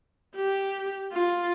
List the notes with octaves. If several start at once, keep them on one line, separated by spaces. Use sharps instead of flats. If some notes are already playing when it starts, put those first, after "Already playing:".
G4
F4